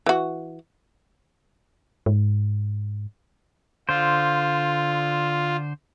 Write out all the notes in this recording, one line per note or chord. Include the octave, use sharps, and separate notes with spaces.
E3 F#4
G#2
D3 F4 C5